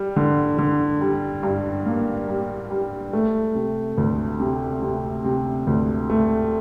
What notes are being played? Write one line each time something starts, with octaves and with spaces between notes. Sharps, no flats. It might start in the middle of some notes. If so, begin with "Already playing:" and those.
Already playing: G3
D3
D3
G3
G2
A#3
G3
G3
A3
C3
D2
C3
C3
C3
D2
A3